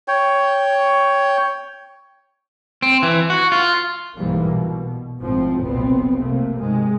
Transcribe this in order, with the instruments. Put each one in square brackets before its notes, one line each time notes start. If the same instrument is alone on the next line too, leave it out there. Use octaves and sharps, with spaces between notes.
[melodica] C#5 G5
[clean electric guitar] C4
E3
F#4
F4
[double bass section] B1 G#2 E3 G3 A#3
B2
G#1 A2 F3 C4
F1 B1 A#2 B3 C4
C3 A3 A#3
G#2 C3 D#3 G#3